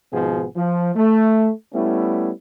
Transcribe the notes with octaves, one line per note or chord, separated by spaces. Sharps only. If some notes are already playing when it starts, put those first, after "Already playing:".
G#1 G#2 B2 F3 B3 G#4
F3
A3
G3 A3 B3 C#4 E4